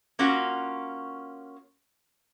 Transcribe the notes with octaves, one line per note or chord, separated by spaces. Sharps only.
A#3 C#4 F4 F#4